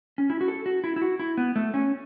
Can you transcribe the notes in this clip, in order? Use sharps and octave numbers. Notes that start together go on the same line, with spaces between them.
C#4
E4
F#4
A4
F#4
E4
E4
F#4
E4
B3
A3
C#4